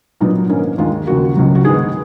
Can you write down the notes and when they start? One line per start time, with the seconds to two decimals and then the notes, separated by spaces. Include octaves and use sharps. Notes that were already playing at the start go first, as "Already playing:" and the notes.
0.21 A#2 F#3 B3 D#4
0.49 G#2 D#3 A#3 C#4
0.78 D#2 D#3 G#3 F4
1.07 D#2 C#3 F3 A#3 F#4
1.37 C#2 C#3 F#3
1.55 F#4
1.65 G#2 D#3 G#3 B3 G#4